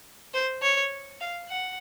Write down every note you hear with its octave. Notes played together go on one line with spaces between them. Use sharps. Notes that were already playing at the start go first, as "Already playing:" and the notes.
C5
C#5
F5
F#5